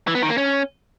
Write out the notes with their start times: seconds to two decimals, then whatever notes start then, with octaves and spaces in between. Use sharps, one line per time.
0.07 E3
0.15 B3
0.22 D#3
0.30 A#3
0.38 C#4